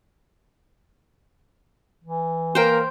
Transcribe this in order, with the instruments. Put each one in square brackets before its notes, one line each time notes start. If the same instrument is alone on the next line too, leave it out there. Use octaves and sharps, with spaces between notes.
[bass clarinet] E3
[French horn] A#3 [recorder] A#4 [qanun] C5 G5